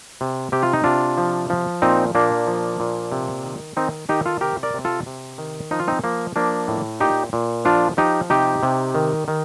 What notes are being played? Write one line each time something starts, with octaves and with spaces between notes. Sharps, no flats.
C3
C3 G4
F4
D#4
C3 D4 F4
F3
F3
A#2 C4 D#4
A#2 A#3 D4
F3
A#2
C3
D#3
D#3 C4 D#4
D#3 D#4 G4
F4 A4
C3 G4 A#4
A#4 D5
C3
F4 A4
C3
D#3
F3 D#4
F4
C4 D#4
F3 A#3
F3 A#3 D4
A2
A#2 D#4 G4
A#2
F3 D4 F4
F3 D#4 G4
C3 D#4 G4
C3
D#3
D#3